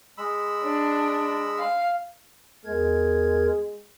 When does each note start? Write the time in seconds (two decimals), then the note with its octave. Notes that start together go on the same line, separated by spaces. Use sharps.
0.18 G#3 B5 E6
0.64 D4
1.59 F5
2.65 E2 G#3 A#4 G#6